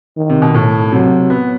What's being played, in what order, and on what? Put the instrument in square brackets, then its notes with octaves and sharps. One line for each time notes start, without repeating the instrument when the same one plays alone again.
[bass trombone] D#3
[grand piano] C3
B2
A2
[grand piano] C3 [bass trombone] F#3
[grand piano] B3